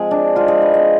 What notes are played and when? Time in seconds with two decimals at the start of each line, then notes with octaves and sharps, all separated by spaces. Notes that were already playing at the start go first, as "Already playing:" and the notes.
Already playing: F3 G#3 C4 G#4
0.11 D4
0.36 F3 G#3 C4 F4
0.48 G#4
0.62 B4
0.74 D#5